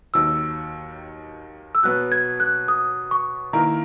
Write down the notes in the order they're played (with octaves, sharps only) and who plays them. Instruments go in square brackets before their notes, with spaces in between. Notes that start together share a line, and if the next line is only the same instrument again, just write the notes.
[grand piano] D#2 D#3 F#3 [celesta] E6
[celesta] E6
[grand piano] B2 F#3 B3 [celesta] F#6
[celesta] G#6
F#6
D#6
C#6
[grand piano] D#3 A#3 E4 A#4 [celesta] A#5